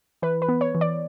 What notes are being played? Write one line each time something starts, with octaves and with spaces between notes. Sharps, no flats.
E3 B4
B4
B3
C#5
E3
D5